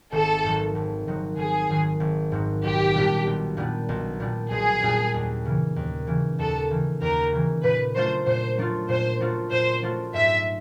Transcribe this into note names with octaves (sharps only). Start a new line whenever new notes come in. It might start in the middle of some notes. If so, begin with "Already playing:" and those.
G#1 A4
G#2 D#3 F#3
G#1
G#2 D#3 F#3
G#1 G#4
G#2 D#3 F#3
G#1
G#2 D#3 F#3
B1 G4
A#2 G3 B3 D4
B1
A#2 G3 B3 D4
B1
A#2 G3 B3 D4
B1 G#4
A#2 G3 B3 D4
D#2
C#3 E3
D#2
C#3 E3
D#2 A4
C#3 E3
D#2 A#4
C#3 E3
A#2 B4
F#3 A3 D4 F4 C5
A#2 C5
F#3 A3 D4 F4
A#2 C5
F#3 A3 D4 F4
A#2 C5
F#3 A3 D4 F4
G#2 E5